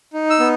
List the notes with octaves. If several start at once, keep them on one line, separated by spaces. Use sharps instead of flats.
D#4
E6
B3